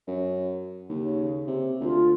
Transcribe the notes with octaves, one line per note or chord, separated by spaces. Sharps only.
F#2
D#2 C#3
C3
D2 F4